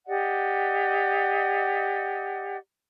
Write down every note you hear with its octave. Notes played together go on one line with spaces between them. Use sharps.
G4 D5 D#5 F#5